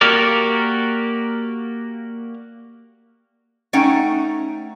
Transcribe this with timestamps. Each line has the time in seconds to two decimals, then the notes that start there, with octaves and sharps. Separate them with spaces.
0.01 A#3 F#4 G4 A#4 D5
3.73 A3 C#4 D#4 F#5 G5